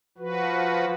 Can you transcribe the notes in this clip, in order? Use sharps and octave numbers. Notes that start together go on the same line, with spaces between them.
F3 F#4 B4